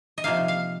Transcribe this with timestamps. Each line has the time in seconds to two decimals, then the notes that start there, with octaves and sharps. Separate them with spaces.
0.18 D#5
0.24 C3 F3 A#3 D#4 F5
0.48 F5